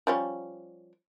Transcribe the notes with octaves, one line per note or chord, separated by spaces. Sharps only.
F3 G3 C#4